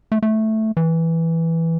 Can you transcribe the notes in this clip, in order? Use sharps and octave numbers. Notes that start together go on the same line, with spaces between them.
A3
A3
E3